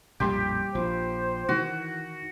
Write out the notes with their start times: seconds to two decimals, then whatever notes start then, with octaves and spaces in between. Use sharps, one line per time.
0.20 A#1 F2 A2 G3 G4 C6
0.75 A#1 F3 C5
1.49 D#3 E3 F#4